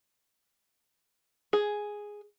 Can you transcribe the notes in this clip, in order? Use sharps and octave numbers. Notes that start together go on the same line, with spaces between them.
G#4